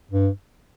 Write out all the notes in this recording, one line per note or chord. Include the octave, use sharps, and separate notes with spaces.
G2